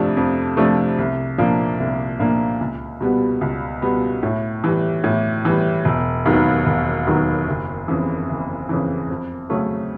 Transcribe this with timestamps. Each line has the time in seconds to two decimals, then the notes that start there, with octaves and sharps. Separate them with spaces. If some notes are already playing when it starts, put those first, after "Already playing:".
Already playing: F2 C3 F3 A3 D4
0.17 F2
0.57 C3 F3 A3 D4
0.98 C2
1.38 A#2 F3 A#3 D4
1.80 C2
2.19 A#2 F3 A#3 D4
2.61 C#2
3.01 B2 G3 B3
3.41 C#2
3.82 B2 G3 B3
4.23 A2
4.64 E3 G3
5.04 A2
5.45 E3 G3
5.85 E1
6.26 D#2 D#3 F#3 B3
6.66 E1
7.07 D#2 D#3 F#3 B3
7.48 F#1
7.88 F2 C#3 E3
8.29 F#1
8.69 F2 C#3 E3
9.10 F2
9.50 C#3 F#3 A3 C#4